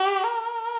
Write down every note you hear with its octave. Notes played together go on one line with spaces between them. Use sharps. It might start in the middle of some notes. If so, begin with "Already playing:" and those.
Already playing: G4
A#4